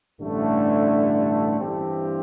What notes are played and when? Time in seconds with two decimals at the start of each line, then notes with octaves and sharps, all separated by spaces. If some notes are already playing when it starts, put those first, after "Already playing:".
0.20 A1 G2 D3 A3 D4
1.59 G2 E3 C4 G4